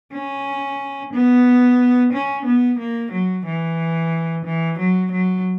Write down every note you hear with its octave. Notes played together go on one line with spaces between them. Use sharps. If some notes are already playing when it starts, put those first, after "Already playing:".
C#4
B3
C#4
B3
A#3
F#3
E3
E3
F#3
F#3